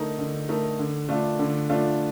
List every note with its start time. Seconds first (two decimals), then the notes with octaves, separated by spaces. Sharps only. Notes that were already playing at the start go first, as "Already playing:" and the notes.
Already playing: D3 A3 D#4 A#4
0.18 D3
0.49 A3 D#4 A#4
0.79 D3
1.09 A3 D4 F4
1.39 D3
1.70 A3 D4 F4